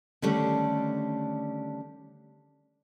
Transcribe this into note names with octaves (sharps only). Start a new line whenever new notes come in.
D3 D#3 G3 A3 C#4 D4